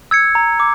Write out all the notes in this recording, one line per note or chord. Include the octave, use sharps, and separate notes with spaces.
E6 G#6 C#7
A#5
D6